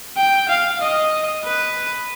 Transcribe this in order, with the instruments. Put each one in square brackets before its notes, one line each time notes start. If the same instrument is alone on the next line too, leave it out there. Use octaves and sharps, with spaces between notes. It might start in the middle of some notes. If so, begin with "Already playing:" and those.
[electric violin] G5
F5
D#5
B4